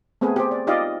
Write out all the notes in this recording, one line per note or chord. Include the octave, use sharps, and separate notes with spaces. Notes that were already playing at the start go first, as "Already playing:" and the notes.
A3 B3 C4 G#4 B4
G4 C5
D5
D#4 F4 G4 D5 D#5 F5